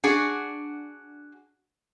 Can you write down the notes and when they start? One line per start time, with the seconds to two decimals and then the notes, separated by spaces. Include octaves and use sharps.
0.04 D4 F#4 G#4 F#5